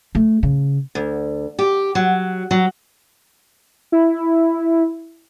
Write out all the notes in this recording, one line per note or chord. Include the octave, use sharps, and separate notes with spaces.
A3
C#3
D2
G4
F#3
F#3
E4